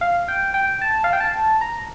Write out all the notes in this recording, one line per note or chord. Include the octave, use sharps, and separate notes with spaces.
F5
G5
G5
A5
F5
G5
A5
A#5